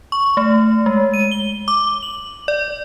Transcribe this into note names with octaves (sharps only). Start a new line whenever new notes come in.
C#6
A3
G#3
D#7
G7
D6
F#7
D5